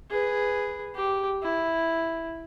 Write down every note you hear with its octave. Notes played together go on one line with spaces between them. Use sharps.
G#4 B4
G4
E4